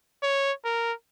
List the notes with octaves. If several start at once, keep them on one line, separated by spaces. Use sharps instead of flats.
C#5
A#4